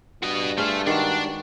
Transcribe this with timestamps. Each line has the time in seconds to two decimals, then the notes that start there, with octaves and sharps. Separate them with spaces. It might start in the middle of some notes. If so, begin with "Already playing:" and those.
0.23 G2 F#4 D#5
0.58 A3 F4 G#4 F5
0.87 D#3 G#3 D4 F#4